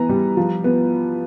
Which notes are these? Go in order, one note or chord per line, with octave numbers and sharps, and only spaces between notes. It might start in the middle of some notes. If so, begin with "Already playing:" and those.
Already playing: E3 B3 A#5
G3
F3
B3